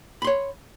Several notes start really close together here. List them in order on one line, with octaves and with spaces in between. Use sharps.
B5 C6 C#5